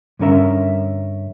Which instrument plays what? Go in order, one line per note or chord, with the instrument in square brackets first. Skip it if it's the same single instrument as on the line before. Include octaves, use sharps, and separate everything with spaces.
[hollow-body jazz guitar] G2 D3 C#4 A#4 E5